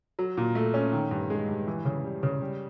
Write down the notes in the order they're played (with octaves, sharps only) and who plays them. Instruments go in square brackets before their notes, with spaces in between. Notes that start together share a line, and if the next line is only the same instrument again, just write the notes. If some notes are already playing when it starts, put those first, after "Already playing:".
[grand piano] F#3
A#2
A3
C#4
D#3
G2
G#3
G2
E3
C#3
G3
C#3
G3